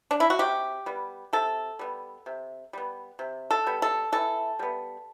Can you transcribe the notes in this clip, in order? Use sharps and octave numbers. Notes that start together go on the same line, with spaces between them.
D4
E4
F#4
C3 G4
G3 B3
C3 A4
G3 B3
C3
G3 B3
C3
A4
G3 B3
A4
E3 A4
G3 B3